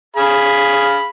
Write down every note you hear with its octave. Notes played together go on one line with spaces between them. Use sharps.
G#4 F5 B5